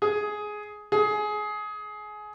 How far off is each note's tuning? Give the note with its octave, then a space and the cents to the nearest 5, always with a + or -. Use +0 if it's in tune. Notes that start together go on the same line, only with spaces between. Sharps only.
G#4 +10
G#4 +20